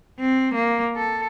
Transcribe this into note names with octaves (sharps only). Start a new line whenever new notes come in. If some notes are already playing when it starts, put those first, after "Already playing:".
C4
A#3
A4